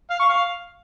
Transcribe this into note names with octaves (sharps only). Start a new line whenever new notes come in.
F5
C#6
F5